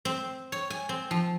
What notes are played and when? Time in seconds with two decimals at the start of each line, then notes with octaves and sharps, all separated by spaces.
0.05 C4
0.52 C#5
0.70 G#5
0.89 C4
1.11 F3